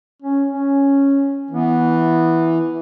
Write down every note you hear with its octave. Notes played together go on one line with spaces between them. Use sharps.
C#4
C#4
E3 B3